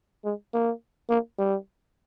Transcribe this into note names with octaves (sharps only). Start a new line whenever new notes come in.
G#3
A#3
A#3
G3